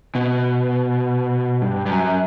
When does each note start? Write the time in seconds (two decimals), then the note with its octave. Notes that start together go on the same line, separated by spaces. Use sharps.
0.15 B2
1.62 G2
1.86 G2
1.91 F#2